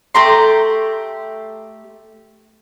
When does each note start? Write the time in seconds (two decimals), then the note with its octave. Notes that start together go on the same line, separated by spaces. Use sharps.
0.15 A3 G4 A#5 C6